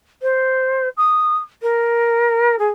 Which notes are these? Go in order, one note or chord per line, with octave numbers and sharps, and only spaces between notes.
C5
D#6
A#4
G#4